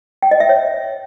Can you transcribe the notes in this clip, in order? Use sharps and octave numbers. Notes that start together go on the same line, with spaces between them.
G5
D#5
E5
C#5